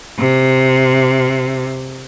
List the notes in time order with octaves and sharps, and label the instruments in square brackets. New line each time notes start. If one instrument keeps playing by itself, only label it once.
[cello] C3